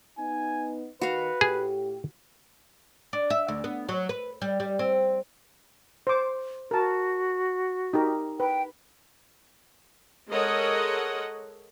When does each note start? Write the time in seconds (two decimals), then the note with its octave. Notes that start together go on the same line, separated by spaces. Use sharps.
0.19 B3 D#4 G#5
1.01 D#3 F#4 B4 F5
1.41 A2 G4 G#4
3.13 D4
3.30 E5
3.48 D2
3.64 B3
3.89 F#3
4.09 B4
4.42 G3
4.60 G3
4.79 C4
6.07 C5 D6
6.71 F#4 A#4 A5
7.93 D#4 G4 A#4
8.40 B4 G5
10.29 G#3 A4 A#4 C#5 D#5 F#5